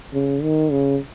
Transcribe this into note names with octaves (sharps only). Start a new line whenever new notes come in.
C#3
D#3
C#3